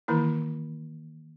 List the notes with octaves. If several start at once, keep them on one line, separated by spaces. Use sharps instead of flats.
D#3 E3 A#3 E4